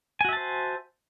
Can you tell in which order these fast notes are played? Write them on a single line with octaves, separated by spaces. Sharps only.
G#5 F#4 E5 A5 C5